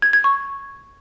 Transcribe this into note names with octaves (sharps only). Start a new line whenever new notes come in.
G#6
G#6
C#6